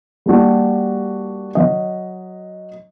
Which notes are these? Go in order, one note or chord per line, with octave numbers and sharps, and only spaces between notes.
G3 A#3 D4 F#4 G4
F#3 D#5